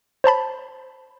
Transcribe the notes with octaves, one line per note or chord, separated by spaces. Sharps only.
C5 C#5 A5 B5